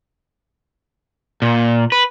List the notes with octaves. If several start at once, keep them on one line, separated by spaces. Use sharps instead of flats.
A#2
B4